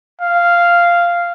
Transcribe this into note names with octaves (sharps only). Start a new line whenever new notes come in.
F5